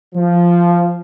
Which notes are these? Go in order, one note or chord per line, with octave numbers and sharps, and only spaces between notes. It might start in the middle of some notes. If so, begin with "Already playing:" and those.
F3